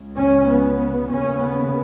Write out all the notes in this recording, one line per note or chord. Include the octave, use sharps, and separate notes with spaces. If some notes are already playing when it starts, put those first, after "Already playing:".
Already playing: C#2 C#3
C#4
B3
D#2 C#3 C#4
B3